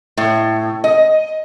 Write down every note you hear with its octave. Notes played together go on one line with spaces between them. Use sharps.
A2
D#5